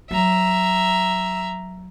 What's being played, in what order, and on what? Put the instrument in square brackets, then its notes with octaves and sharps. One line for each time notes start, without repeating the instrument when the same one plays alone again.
[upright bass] F#3 [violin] E5 A#5